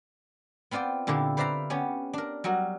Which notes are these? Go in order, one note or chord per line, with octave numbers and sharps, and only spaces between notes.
B3 C4 F4 D5 G5
A#2 D3 A#3 E4 G4
B4 C5 D5 E5 F5 A#5
B3 C#4 G4 C#5
D4 A#4
F#3 G3 F#4 A#4